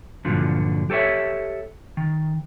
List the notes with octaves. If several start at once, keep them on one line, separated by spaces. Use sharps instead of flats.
G2 A#2 D3 F3 F#3
G4 A4 B4 C#5 E5
D#3